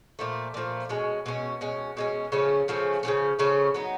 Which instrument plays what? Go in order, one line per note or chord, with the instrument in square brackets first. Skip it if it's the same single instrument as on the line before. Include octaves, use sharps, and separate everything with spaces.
[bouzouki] A#2 F3 A3
A#2 F3 A3
B2 G#3 C#4
B2 G#3 C#4
B2 G#3 C#4
B2 G#3 C#4
C#3 F3 A3 C#4
C#3 F3 A3 C#4
C#3 F3 A3 C#4
C#3 F3 A3 C#4
F#3 B3 D#4